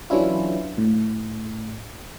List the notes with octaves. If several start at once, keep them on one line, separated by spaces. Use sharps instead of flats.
E3 F#3 C#4 D4 E4 F4
A2